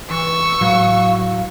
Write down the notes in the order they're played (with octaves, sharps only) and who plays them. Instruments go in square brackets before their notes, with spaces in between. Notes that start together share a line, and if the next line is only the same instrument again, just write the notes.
[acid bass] E3 [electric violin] C#6 E6
[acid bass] A2 [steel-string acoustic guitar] F#3 [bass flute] F5